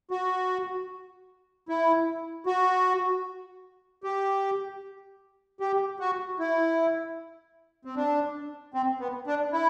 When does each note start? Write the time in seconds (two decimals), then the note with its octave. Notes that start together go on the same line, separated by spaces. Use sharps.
0.11 F#4
1.69 E4
2.46 F#4
4.04 G4
5.60 G4
6.00 F#4
6.39 E4
7.85 C4
7.96 D4
8.74 C4
9.00 B3
9.27 D4
9.53 E4